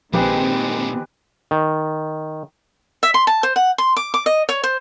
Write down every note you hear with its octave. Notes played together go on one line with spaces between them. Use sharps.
A#1 A#2 D#3 G#3 C4 G4 G#4 B4
D#3
E5
C6
A5
C5
F#5
C6
D6
D6
D#5
C#5
C5